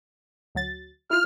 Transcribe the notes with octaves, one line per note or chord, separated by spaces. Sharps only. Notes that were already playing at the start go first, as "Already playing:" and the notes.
D2 F#3 A6
E4 F4 F6